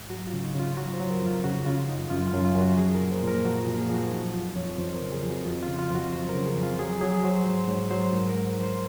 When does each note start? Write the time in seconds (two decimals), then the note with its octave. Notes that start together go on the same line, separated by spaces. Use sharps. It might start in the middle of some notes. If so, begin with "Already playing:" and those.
Already playing: G#2
0.10 F#3 F#4
0.27 F4
0.33 C#3
0.44 D#4
0.55 C#3
0.60 F4
0.77 F#3 F#4
0.94 C5
1.00 F#3
1.10 A#4
1.21 F2
1.27 F4
1.44 C#3 F#4
1.66 C#3 F4
1.88 F#2 D#4
2.10 F#2 F4
2.27 F4
2.33 F#2
2.45 F4
2.56 F#2
2.61 F#4
2.78 F3 G#4
2.95 A#4
3.01 A#2
3.12 C5
3.23 A#2 A#4
3.44 F3 F#4
3.61 F4
3.66 A#2
3.78 G#4
3.89 F3 F#4
4.11 F#3 D#4
4.34 F2 F4
4.56 F2 C#5
4.78 F2 C5
4.95 A#4
5.01 C#3
5.12 G#4
5.23 F2
5.29 F#4
5.45 F2 F4
5.62 C#3 F4
5.79 F4
5.90 F2 F#4
6.13 F#3 C5
6.29 A#4
6.34 C#3
6.46 G#4
6.56 F2
6.63 F4
6.79 F#3 G#4
7.01 F#3 G#4
7.24 F#3 C5
7.45 G#2 C5
7.68 G#2 C#5
7.90 F#3 C5
8.13 G#2 A#4
8.29 A#4
8.35 G#2
8.47 C5
8.57 F3
8.63 C5